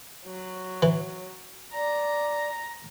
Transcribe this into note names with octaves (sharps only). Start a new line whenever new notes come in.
F#3
E3
D5 A#5